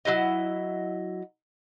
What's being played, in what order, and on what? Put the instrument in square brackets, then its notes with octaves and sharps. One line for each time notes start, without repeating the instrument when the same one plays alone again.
[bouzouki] F#3 D#4 E4 D#5